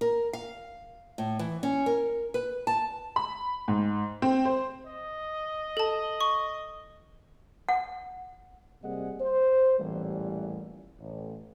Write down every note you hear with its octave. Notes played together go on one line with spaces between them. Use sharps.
A#4
F5
A2
E3
C#4
A#4
B4
A5
B5
G#2
C4
C5
D#5
A4 A5
C#6
F#5
C3 G3 A#3 G#4 D#5 F#5
C5
A1 E2 A#2 E3 G3
A1